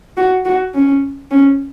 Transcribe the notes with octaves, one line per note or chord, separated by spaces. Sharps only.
F#4
F#4
C#4
C#4